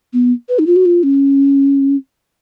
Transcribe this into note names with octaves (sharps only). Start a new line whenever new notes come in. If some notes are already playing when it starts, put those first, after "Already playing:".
B3
B4
D#4
F4
F#4
F4
C#4